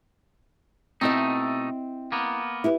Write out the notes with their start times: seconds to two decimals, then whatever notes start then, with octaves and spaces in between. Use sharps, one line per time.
1.01 B2 A3 C4 D#4 E4 D#5
2.12 A#3 B3
2.64 E4 G4 B4